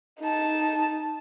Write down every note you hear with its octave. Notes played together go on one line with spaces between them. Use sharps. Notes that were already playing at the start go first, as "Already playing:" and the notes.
D#4 A5